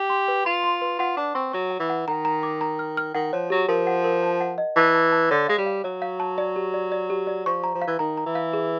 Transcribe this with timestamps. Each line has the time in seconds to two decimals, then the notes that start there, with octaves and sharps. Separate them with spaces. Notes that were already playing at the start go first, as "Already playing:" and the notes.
Already playing: G4
0.10 C6
0.28 B4
0.45 F4 C6
0.64 C6
0.82 B4
0.99 F4 F#5
1.17 D4 A5
1.35 C4 C#6
1.53 F#3 C#6
1.71 F#5
1.80 E3
1.90 F#5
2.08 D#3 A#5
2.25 A#5
2.43 D6
2.61 A#5
2.79 F6
2.97 F6
3.14 D#3 F#5
3.33 F3 C#5
3.50 F#3 G4
3.68 F3 A#4
3.87 F#5
4.04 A#4
4.23 A5
4.41 F#5
4.58 D#5
4.76 E3 A5
4.95 A5
5.12 A5
5.30 D3 C#5
5.48 G#3 F5
5.58 G3
5.66 F5
5.84 F#3 C#5
6.02 F5
6.20 A5
6.38 D5
6.56 G4
6.74 D5
6.92 D5
7.10 G4
7.27 D5
7.46 F3 C#6
7.64 A#5
7.75 F3
7.82 F5
7.87 E3
7.99 D#3 A#5
8.17 A#5
8.26 E3
8.35 F5
8.53 G#4